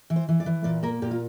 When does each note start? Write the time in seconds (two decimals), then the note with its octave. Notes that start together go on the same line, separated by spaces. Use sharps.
0.10 E3
0.16 C5
0.29 E3
0.40 D5
0.46 E3
0.64 A#2 D5
0.83 A#3 A#4
1.02 A#2 G4
1.11 F4